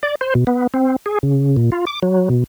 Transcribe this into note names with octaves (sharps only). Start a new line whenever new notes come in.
D5
C5
B2
B3
C4
G#4
C#3
A#2
F4
D6
F#3
B2